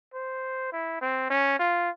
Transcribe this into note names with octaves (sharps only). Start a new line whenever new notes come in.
C5
E4
C4
C#4
F4